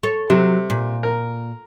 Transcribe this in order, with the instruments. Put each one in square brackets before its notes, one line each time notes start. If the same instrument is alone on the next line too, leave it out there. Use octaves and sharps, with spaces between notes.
[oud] A4 C#5
[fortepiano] C3 [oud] F#3
[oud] A#2
[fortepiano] A#4